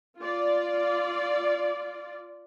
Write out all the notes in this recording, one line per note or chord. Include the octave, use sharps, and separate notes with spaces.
F4 D5